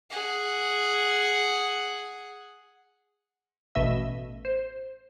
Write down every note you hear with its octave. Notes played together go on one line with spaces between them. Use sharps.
G#4 F#5
A1 B2 A3 D#5 E5 E6
C5